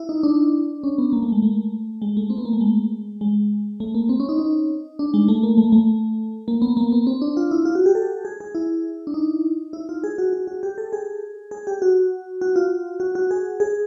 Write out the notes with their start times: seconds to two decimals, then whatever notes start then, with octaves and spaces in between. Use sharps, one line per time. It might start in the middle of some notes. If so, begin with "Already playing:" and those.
Already playing: E4
0.09 D#4
0.23 D4
0.84 C#4
0.98 B3
1.12 A#3
1.22 A3
1.32 G#3
1.42 A3
2.02 G#3
2.17 A3
2.30 C4
2.38 B3
2.45 A#3
2.53 A3
2.61 G#3
3.21 G#3
3.80 A3
3.94 A#3
4.09 C4
4.20 C#4
4.29 D#4
4.39 D#4
4.99 D4
5.14 G#3
5.28 A3
5.43 A#3
5.57 A3
5.72 A3
6.48 A#3
6.62 B3
6.77 A#3
6.92 B3
7.07 C4
7.22 D4
7.37 F4
7.51 E4
7.65 F4
7.75 F#4
7.86 G4
7.95 A4
8.25 G#4
8.40 G#4
8.55 E4
9.07 D4
9.14 D#4
9.73 E4
9.89 F4
10.04 G#4
10.18 F#4
10.33 F#4
10.47 F#4
10.63 G4
10.78 A4
10.93 G#4
11.51 G#4
11.67 G4
11.82 F#4
12.41 F#4
12.56 F4
13.00 F#4
13.15 F#4
13.31 G#4
13.60 G#4